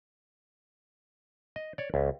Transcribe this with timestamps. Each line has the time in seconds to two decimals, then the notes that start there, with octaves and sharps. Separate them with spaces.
1.56 D#5
1.78 C#5 D5
1.94 C#2